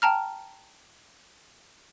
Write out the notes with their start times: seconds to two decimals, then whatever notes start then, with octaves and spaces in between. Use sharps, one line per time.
0.02 G5 A5 A#5 F6